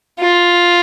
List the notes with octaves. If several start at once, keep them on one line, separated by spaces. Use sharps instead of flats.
F4